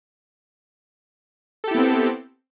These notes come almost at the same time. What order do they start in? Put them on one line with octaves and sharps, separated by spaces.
A4 G4 E4 B3 C4